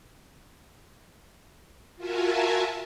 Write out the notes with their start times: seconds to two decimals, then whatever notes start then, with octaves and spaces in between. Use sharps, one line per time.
1.96 F4 F#4 A#4 E5 G#5 A5